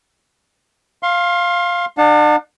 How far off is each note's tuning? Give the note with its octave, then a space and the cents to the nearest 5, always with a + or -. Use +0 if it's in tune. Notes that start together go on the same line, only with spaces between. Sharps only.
F5 +0 C6 +30
D4 +40 F#5 -45 A5 -15